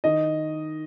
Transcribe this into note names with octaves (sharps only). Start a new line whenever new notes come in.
D#3 D#5